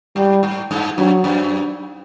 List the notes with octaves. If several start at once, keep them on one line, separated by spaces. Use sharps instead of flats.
G#2 G3
G#2
G2
F#2 F#3
F#2